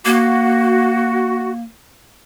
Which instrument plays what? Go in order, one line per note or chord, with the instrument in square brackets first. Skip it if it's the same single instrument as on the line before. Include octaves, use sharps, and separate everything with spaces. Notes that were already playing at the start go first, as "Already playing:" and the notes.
[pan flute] A#3 [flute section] F#4